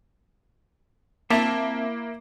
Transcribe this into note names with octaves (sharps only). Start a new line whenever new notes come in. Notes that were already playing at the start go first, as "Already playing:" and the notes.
A#3 C4 E4 E5 A5